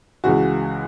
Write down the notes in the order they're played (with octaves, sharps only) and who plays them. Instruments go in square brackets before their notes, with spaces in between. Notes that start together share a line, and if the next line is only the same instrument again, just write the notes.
[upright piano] C#2 C#3 E3 G#3 F#4